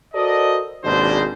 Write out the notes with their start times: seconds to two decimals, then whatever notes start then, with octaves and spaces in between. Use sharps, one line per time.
0.14 F#4 A4 A#4 C5 D5 D#5
0.84 G#1 D#2 B2 G#3 D4 C5